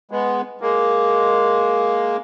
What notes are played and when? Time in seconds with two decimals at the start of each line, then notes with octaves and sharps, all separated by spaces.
0.11 G#3 B3
0.61 G#3 A#3